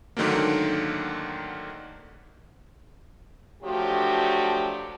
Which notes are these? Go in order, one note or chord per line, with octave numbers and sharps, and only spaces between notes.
G#2 D3 D#3 F#3 A3 A#3
F3 F#3 A3 D4 F#4 G4